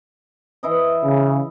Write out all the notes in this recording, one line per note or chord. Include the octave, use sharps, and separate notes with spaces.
E3 E4 D#5
C#3